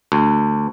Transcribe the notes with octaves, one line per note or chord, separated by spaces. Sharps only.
D2